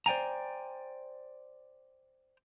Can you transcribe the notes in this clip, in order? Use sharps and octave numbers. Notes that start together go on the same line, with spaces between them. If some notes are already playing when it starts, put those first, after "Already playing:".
C5 D5 G5 G#5 A#5